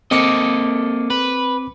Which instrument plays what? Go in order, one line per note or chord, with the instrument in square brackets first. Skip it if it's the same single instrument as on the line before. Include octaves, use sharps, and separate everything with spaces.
[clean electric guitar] A#3 A4 D#5 [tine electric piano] C4 D6 C#7
[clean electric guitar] B4